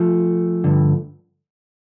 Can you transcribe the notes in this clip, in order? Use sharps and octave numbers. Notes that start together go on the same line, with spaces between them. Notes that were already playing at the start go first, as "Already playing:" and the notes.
Already playing: F3 A3
G2 D3